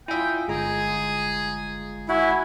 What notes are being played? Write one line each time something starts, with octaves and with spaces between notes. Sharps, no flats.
E4 F4 D#5 E5 G5 G#5
G1 G#3 G#4 A#5
E4 F#4 G#5